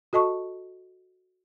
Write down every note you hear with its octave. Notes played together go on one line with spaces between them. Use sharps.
F#4 A4 D#5 A5 C#6